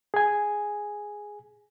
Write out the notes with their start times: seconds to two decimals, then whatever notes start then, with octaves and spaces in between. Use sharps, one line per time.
0.14 G#4 G#5